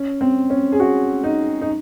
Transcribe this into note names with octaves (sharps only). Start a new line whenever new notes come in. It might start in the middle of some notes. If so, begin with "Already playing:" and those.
Already playing: C#4
C4
C#4
G#4
F#4
D#4
D#4